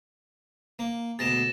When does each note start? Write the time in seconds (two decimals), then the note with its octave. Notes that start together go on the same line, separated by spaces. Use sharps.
0.79 A#3
1.19 D2 B2 G#4 A6 A#6 E7